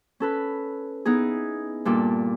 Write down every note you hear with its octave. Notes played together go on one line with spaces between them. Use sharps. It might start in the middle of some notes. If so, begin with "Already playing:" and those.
C#4 A4 B4
B3 D#4 E4 G#4
G2 A#2 A4 D6